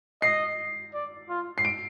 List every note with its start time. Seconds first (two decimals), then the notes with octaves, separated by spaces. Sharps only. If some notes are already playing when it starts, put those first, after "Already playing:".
0.22 D#5 C7
0.94 D5
1.29 F4
1.58 C7
1.65 D7